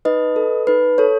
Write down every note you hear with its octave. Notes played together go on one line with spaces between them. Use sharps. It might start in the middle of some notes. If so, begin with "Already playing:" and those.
D#4 B4 D#5
A4
D#4 B4
A4 C#5